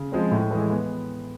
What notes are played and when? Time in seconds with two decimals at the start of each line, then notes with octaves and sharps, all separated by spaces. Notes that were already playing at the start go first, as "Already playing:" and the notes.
Already playing: C#3
0.12 F3 G#3 C4
0.31 A2
0.51 E3 G#3
0.70 B3